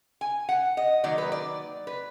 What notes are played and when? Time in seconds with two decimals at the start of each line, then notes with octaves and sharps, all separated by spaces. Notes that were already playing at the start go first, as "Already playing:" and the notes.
0.21 G#5
0.49 F#5
0.77 D#5
1.04 D#3 F#3 A#3 D5
1.18 B4
1.32 D5
1.87 B4